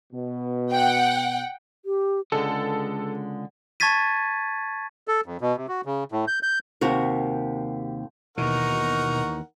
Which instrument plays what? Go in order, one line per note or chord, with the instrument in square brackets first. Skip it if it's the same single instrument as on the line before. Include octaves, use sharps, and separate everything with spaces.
[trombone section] B2
[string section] F#5 G5
[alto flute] G4
[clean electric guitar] C#2 D3 G#3 [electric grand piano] A4
[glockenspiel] A5 C#6 G#6 A6 B6 D#7
[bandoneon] A4
F2
B2
C3
F#4
C#3
A2
G6
G6
[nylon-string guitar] D#2 C3 F#4 A#4
[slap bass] D#2 E3 [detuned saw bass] B2 [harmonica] D#4 A#4 F#5 [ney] C#6